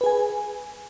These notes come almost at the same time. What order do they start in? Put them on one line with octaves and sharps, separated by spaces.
B4 G#4 G#5